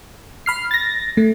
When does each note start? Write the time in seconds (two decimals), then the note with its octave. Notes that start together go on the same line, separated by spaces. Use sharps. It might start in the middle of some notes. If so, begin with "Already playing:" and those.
0.46 B5 F6 C7
0.71 A6 A#6
1.17 A3